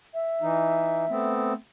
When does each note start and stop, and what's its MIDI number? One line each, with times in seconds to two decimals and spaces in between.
0.14 1.33 76
0.42 1.05 52
0.42 1.05 63
1.10 1.53 57
1.10 1.53 59
1.10 1.53 60